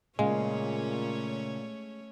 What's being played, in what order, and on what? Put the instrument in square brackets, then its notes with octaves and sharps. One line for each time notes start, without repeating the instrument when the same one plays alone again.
[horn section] A#2 [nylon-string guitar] C#3 G#4 F5 [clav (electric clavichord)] G#3 [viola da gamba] A3 C#4 C#5